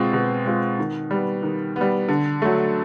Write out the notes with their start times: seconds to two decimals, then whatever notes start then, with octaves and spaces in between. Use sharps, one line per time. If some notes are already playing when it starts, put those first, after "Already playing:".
Already playing: B2 G#3 C4 F4
0.13 B2
0.46 G#3 C4 F4
0.79 D#3
1.11 G3 B3
1.43 D#3
1.76 B3
1.81 G3
2.09 D3
2.42 F#3 A3